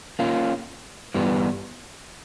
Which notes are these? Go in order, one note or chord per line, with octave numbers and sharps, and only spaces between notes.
A#3 C#4 F4
G2 E3 G3 B3